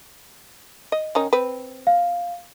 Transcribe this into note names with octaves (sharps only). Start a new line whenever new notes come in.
D#5
D#3 C#4 D#4
C4 B4
F5